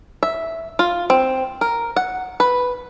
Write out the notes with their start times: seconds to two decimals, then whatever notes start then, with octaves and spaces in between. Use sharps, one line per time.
0.23 E5
0.79 F4
1.10 C4
1.61 A#4
1.96 F#5
2.40 B4